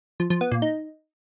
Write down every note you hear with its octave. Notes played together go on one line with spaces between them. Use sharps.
F3
F3
B3
A#2
D#4